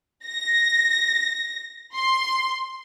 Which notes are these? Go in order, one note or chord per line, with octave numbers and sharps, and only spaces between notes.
A#6
C6